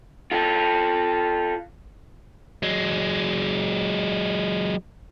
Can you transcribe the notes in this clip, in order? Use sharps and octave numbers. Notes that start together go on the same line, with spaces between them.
F4 A4
F#3 G#3